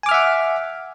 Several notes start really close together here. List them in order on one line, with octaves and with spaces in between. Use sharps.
G#5 D6 F6 E5 F#5